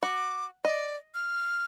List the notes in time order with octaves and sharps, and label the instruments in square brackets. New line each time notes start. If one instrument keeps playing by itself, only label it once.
[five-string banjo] F#4 [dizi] D6
[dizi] D5 [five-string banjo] D#5
[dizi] F6